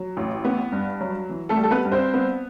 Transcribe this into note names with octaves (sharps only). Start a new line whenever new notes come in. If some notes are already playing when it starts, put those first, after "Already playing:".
Already playing: F#3
A1
B3
G2
F#3
E3
A3 A4
G3
A4
B3 B4
G2
C4 C5
B3